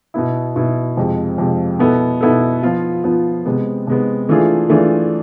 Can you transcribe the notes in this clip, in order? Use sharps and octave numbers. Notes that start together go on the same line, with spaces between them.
B2 B3 E4
B2 B3 E4
F2 C3 G#3
F2 C3 G#3
B2 B3 E4 A4
B2 B3 E4 A4
F3 B3 F4
F3 B3 F4
C3 G#3 B3
C3 G#3 B3
E3 A3 D4 F4 G#4
E3 A3 D4 F4 G#4